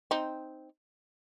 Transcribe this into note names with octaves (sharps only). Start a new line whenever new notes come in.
C4 D#4